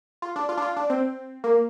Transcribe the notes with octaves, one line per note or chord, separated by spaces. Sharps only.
F4
D4
F4
D4
F4
D4
C4
A#3